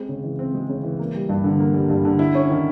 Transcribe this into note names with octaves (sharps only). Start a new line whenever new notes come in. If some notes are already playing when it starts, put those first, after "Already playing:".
Already playing: G#3 C4
C#3
E3
C4
G#3
C#3
E3
A#3
G3
G2
D3
A#3
G3
G2
D3
E4
C#4
D#3